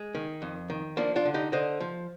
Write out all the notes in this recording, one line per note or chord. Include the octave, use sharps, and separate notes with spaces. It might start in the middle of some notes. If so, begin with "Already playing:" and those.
Already playing: G#3
D#3
F2
D#3
F3 A#3 D4
D4 F4
D3
D#4 G4
D3 C5 D#5
F3